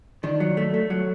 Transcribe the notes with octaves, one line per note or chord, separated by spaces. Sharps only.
D#3 D4
F#3
A3
A3
F#3